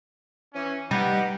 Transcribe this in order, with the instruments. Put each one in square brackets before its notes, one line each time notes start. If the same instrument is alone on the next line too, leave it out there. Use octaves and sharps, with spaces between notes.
[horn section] E3 C#4
[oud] G3 [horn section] B3 G4 [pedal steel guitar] D#4 F#5